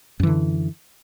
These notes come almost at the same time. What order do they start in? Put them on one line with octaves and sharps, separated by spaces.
F#2 E3 D3